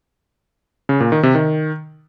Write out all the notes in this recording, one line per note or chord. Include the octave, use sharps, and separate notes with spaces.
C#3
A#2
D#3
C3
D#3